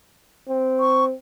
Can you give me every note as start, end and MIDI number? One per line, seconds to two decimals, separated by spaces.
0.49 1.13 60
0.80 1.05 85